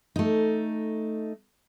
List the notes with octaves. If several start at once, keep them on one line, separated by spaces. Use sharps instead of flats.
A3 D#4